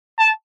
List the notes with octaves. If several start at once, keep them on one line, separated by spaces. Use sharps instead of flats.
A5